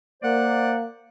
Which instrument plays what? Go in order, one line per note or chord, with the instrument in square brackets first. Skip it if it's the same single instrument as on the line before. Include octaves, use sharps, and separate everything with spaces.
[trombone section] A#3 [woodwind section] C5 D5 F#5